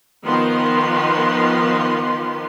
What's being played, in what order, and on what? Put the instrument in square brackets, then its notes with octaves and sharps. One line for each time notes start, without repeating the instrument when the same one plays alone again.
[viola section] D#3 F3 B3 C6